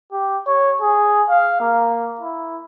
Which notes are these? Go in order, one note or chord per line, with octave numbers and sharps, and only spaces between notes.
G4
C#5
G#4
F5
A#3
E4